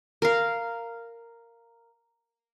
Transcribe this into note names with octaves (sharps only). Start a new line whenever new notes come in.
A#4 F5